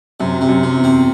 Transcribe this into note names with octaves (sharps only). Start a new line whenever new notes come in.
F#2 C3
C3
F#2
C3
E2
C4